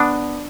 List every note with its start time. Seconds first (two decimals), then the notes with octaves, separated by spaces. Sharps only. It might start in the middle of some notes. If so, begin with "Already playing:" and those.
Already playing: B3 D4